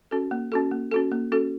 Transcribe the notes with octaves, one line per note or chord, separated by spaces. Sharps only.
C#4 F#4 A4
A#3
C#4 F#4 A4
A#3
C#4 F#4 A4
A#3
C#4 F#4 A4